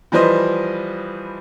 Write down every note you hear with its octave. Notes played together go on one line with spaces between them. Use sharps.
E3 F3 G3 B4 C5 D#5